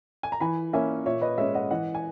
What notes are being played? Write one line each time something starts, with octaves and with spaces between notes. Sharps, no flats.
G#5
A#5
E3 G#5 B5
A#3 C#4 E5 G#5
A#2 C#5 E5
B4 D#5
G#3 C#4 C#5 E5
D#5 F#5
E3 D#5 F#5
G#5